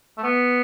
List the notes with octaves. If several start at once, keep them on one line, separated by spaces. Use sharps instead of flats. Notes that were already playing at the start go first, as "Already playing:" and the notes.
A3
B3